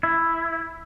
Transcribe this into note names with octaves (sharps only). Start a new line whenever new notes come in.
E4